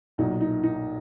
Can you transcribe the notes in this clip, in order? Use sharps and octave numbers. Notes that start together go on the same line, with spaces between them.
B1 A#2 F#3 D#4
D#4
D#4